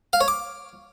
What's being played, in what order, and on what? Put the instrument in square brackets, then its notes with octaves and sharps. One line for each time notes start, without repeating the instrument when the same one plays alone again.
[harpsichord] F5
C#5
D6